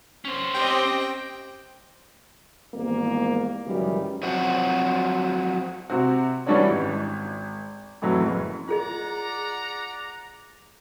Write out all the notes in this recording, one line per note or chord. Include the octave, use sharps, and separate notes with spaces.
C#4 C5
C4 G4 D#5 G5
G#1 E2 G#2 G3 A#3
C#2 F#2 D#3 E3 G3
F3 F#3 C4 F#4
C3 C4 F#4
E3 G3 C#4 D4 F#4 C#5
G#1
F2 A2 E3 F#3
F#1
F4 G#4 D5 D#5 F#5 A#5